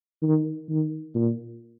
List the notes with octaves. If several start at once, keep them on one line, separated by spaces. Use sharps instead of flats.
D#3
D#3
A#2